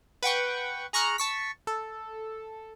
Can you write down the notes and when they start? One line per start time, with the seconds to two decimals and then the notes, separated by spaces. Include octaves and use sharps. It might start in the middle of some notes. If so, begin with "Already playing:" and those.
0.23 B4 F#5 G5 C#6
0.93 G#4 A#5 C#6 F6 F#6
1.18 A5 C#6 B6
1.67 A4